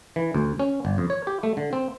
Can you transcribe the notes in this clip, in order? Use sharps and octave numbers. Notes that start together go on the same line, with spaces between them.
E3
D2
C#4
G1
F2
C#5
G4
A3
D3
C4